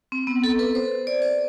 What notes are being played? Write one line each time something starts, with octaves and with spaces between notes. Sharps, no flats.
C4
B3
A4
B4
C5
D5
C5